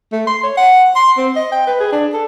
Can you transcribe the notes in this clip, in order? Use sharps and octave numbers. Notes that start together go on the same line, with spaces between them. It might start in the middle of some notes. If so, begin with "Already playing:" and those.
A3
C6
C#5
F#5
C6
C4
D#5
G5
B4
G#4
D4
A4